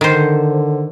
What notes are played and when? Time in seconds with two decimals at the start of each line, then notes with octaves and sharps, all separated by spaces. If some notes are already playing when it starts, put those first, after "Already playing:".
0.01 D3 D#3 C5